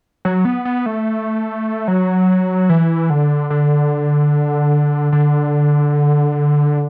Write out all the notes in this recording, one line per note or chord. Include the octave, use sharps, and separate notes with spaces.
F#3
B3
B3
A3
F#3
E3
D3
D3
D3